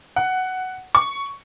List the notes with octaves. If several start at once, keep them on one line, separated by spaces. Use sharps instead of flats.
F#5
C#6